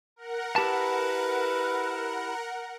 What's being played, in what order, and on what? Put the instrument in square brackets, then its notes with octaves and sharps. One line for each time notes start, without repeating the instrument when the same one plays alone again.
[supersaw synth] A#4 F#5
[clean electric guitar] E4 G4 A5 [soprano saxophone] B4